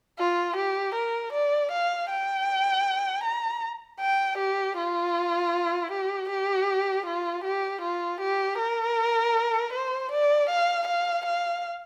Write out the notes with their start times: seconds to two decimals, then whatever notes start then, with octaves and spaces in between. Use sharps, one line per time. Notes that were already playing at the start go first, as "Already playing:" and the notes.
0.19 F4
0.56 G4
0.95 A#4
1.33 D5
1.71 F5
2.10 G5
3.24 A#5
4.00 G5
4.38 G4
4.77 F4
5.92 G4
6.30 G4
7.07 F4
7.45 G4
7.82 F4
8.21 G4
8.59 A#4
9.73 C5
10.12 D5
10.49 F5
10.88 F5
11.26 F5